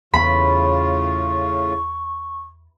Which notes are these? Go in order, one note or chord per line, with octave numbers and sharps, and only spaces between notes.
E2 A2 C#3 B3 F4 B5 C#6